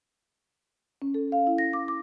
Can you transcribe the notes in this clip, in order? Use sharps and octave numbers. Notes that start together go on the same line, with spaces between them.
C#4
A4
F5
E4
A#6
D6
D6